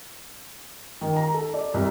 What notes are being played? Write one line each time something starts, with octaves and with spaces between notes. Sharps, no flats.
D#3
A#5
A4
D5
C2